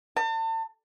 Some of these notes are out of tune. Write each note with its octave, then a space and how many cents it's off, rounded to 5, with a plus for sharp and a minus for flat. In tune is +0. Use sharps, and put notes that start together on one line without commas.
A5 +40